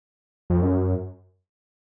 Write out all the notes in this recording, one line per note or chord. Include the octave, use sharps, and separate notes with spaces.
F2
F#2